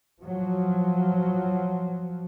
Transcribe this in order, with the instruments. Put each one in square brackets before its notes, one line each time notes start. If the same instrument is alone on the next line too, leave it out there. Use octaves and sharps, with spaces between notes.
[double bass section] F3 F#3